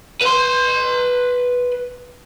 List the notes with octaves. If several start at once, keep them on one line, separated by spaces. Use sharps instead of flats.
B4 C6